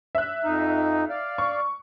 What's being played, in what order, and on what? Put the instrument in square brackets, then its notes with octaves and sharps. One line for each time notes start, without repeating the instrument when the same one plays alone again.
[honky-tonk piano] E5 F#6
[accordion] F2 D#4
D5 F5
[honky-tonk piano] C#6